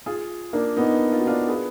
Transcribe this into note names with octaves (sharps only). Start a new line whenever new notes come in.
F4 G#4
A#3 D4
B3 D#4
F4
F#4
D4 F4
G#4 B4